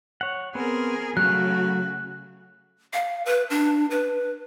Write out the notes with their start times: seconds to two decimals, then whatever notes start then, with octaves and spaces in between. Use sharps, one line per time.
0.21 C#5 F#5
0.55 B3 C4 G#4 A#4
1.17 C#3 F#3 A3 F#4 F5 F#6
2.93 F5
3.26 B4
3.50 D4
3.91 B4